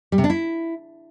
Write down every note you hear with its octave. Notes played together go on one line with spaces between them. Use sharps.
G3
C3
D4
E4